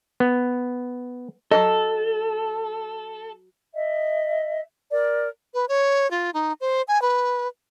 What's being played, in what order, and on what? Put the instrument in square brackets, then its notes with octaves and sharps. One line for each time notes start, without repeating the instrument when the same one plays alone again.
[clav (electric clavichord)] B3
[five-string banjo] F#3 C4 D#5 [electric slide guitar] A4
[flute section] D#5 E5
A#4 D5
[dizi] B4
C#5
F4
D#4
C5
G#5
B4